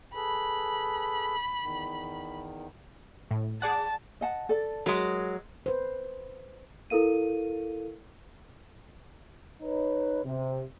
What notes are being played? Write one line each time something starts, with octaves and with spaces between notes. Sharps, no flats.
G#4 A4 B4 B5
E2 D#3
A2
G#4 D5 F#5 A5
D#5 F#5 A5
A4 D5
F#3 G#3 A#4
B4 C5
E4 A4 A#4 F5 D#7
D#4 B4 C#5
C3